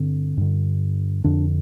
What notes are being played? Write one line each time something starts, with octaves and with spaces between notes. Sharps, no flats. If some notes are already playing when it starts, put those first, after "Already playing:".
Already playing: G2 D3 C4
G2 D3
F2 D3 D4